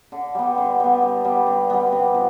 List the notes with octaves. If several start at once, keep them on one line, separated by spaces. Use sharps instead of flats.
D3
G3 B3
D3
G3 B3
D3
G3 B3
D3
G3 B3
C3
F3